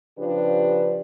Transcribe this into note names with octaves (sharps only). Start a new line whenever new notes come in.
C#3 F3 D4 G4 B4